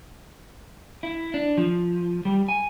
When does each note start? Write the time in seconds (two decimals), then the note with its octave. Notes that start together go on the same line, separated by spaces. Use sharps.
1.03 E4
1.34 D4
1.57 F3
2.25 G3
2.48 G#5